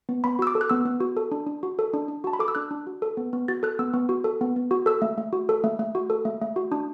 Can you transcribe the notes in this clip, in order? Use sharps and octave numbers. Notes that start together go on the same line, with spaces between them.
B3
B3 B5
F#4 E6
D6
A4
F#6
B3 E6
B3
F#4
A4
D4
D4
F#4
A4
D4
D4
F#4 A5
B5
A4 D6
E6
D4 F#6
D4
F#4
A4
B3
B3
F#4 A6
A4 F#6
B3 E6
B3
F#4
A4
B3
B3
F#4
A4 E6
A3
A3
F#4
A4
A3
A3
F#4
A4
A3
A3
F#4
D4